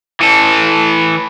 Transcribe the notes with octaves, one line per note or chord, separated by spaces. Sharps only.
E3 A4